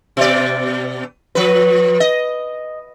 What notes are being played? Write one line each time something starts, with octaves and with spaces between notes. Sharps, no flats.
B2 D5
F3 B4
D#5